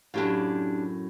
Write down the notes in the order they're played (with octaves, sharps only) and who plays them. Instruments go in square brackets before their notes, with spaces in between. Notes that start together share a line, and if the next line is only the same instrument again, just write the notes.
[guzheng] F#2 A2 [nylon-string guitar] D4 G4 F5